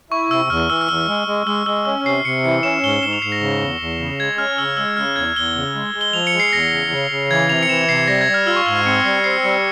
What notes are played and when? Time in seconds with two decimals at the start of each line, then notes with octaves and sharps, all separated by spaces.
0.11 E4 C#6
0.31 C3 E6
0.50 E2 F6
0.70 E3 E6
0.81 F6
0.89 E2 E6
1.08 G#3
1.27 G#3
1.46 G#3 E6
1.66 G#3 E6
1.85 C#4 E6
2.05 C3 C7
2.25 C3 C#7
2.44 E3 C#7
2.63 C#4 E7
2.83 G#2 G7
3.03 G#2 E7
3.13 F7
3.22 G#2 C7
3.32 A#6
3.41 C#3
3.61 E2
3.80 E2
4.00 C#3
4.20 G#3 G#6
4.38 C#4 F6
4.58 C#3 E6
4.77 G#3 E6
4.97 C#3 F6
5.16 E2 G#6
5.36 E2 G7
5.56 C#3
5.75 G#3
5.94 G#3
6.01 G7
6.13 F3 F7
6.27 C#7
6.33 G#3
6.40 C7
6.52 E2 A#6
6.72 C#3
6.91 C#3
7.11 C#3
7.30 E3 G#6
7.49 C3 F7
7.63 C#7
7.69 E3 E7
7.89 C3 C7
8.08 G3 A#6
8.21 G#6
8.28 G3
8.34 F6
8.47 F4 E6
8.56 C#6
8.66 G#2 E6
8.76 F6
8.86 C4 C#7
9.05 G3 C7
9.16 C#7
9.24 C4 C7
9.44 G3 C#7